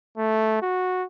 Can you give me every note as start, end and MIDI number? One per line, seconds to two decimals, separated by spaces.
0.18 0.60 57
0.62 1.04 66